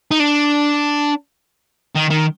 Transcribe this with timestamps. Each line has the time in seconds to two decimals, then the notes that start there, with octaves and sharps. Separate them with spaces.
0.11 D#4
0.20 D4
1.96 D#3
2.10 D#3